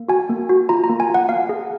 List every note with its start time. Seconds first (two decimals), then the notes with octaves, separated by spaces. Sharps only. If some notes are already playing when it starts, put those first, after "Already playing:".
Already playing: A#3
0.08 F#4 G#5
0.30 A#3
0.49 F#4
0.69 F4 A#5
0.84 A#5
0.89 A#3
1.00 G#5
1.09 F4
1.14 F#5
1.29 A#3 F5
1.49 G#4